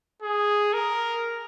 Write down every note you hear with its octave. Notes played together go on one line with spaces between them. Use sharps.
G#4
A#4